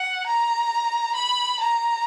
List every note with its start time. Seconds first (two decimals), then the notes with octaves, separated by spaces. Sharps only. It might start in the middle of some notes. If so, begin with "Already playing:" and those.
Already playing: F#5
0.26 A#5
1.15 B5
1.60 A#5